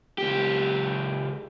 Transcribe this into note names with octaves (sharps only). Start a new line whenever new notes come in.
C#2 G4